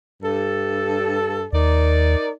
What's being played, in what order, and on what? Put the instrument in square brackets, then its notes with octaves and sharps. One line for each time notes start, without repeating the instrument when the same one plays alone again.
[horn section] G2 A4
[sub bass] D#2 [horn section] D#4 A#4 D5